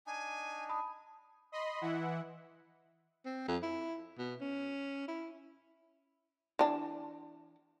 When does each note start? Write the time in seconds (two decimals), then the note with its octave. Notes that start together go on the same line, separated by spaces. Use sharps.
0.07 D4 D#4 G#5
0.69 A5 B5 D#6
1.52 D#5 B5 C6
1.81 E3 E4 F#5
3.25 C4
3.48 F2
3.62 E4
4.18 B2
4.40 C#4
5.08 E4
6.59 E3 D4